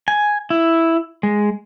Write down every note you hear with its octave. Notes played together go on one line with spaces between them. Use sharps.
G#5
E4
G#3